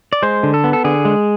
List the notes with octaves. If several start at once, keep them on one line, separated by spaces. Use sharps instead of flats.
D5
G#3 C5
D3
A4
B3
A4
D3 G#4
G#3